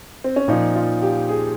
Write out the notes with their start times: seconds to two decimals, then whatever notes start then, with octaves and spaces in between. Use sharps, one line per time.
0.24 C4
0.36 C#4
0.48 A#2 F3 D#4
0.76 F4
1.02 G4
1.29 G#4